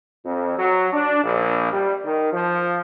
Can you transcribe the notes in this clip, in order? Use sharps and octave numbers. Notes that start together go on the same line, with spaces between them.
F2
F#3
D4
A#1
G3
D#3
F3